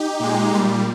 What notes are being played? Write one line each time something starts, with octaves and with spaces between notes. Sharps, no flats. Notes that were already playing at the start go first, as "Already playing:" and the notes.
Already playing: D#4 G4
A#2 G#3
A#2 G3